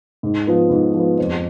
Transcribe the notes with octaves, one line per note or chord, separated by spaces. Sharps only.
G#2
F3 B3
G#2
F3 B3
F2